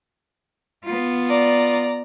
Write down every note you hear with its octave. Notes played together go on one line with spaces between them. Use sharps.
B3 F4
D5 A#5